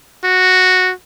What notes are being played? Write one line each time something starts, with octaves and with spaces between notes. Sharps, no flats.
F#4